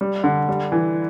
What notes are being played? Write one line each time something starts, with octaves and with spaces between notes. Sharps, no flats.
G3
D3
G3
E3